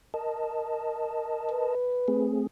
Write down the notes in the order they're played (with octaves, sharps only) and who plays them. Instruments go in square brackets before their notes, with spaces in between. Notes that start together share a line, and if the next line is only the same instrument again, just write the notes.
[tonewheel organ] A#4 D#5 A5
[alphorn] B4
[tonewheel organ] A3 C4 G#4